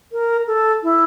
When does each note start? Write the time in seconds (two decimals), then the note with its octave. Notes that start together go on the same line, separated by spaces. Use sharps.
0.12 A#4
0.47 A4
0.83 E4